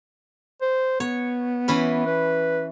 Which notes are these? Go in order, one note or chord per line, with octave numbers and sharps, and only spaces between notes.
C5
B3 C#5
E3 C#4 B5
B4